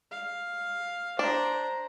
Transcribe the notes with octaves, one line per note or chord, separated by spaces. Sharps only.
F5
D4 C5 A#5